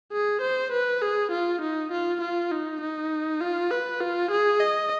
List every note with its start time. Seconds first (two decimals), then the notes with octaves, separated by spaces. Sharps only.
0.12 G#4
0.41 C5
0.72 B4
1.02 G#4
1.31 F4
1.61 D#4
1.92 F4
2.21 F4
2.51 D#4
2.81 D#4
3.41 F4
3.71 B4
4.00 F4
4.31 G#4
4.60 D#5